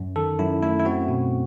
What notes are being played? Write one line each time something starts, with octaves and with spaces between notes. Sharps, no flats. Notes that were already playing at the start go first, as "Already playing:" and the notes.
Already playing: F#2
D#3 A4
F#2 E4
A3 E4
E4
C4 F#4
B2